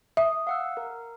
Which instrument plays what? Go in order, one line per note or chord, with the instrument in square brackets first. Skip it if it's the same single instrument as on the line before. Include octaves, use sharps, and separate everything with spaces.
[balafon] E5 [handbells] D#6
[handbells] F5 F#5 E6
A#4